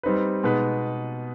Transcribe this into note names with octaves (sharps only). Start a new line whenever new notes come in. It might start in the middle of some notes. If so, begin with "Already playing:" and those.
G3 C4 D#4 B4
B2 G#3 B3 D#4 B4